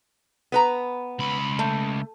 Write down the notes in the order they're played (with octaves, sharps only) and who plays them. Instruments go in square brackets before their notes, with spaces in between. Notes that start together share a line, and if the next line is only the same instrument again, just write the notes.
[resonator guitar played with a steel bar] B3 B4 A#5
[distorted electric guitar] C#2 B5
[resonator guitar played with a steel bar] A3